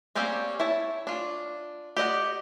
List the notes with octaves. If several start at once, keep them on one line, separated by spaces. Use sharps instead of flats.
A#3 C4 C#4 G4 D5
E4 C#5 A5
D4 F4
G4 D5 D#5 F#5